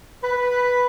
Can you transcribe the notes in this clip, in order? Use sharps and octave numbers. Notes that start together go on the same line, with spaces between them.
B4